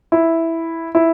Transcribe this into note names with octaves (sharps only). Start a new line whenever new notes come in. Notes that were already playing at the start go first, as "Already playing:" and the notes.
E4
E4